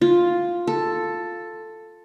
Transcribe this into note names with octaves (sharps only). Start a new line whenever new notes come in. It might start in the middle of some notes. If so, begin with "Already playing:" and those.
F4
A4